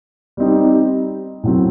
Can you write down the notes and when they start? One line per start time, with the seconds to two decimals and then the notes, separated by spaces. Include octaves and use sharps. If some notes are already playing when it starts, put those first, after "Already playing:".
0.37 G3 C4 D#4 G4
1.43 A2 F#3 C4